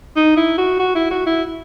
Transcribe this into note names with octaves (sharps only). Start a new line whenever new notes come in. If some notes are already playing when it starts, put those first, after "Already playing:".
D#4
E4
F#4
F#4
E4
F#4
E4